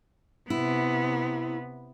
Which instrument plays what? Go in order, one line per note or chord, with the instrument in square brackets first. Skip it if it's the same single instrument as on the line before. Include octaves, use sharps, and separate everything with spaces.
[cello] C3 B3 [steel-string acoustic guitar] E4